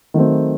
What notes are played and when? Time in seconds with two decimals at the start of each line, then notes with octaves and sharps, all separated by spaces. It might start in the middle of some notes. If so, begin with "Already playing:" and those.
0.14 D#3 F#3 A3 C4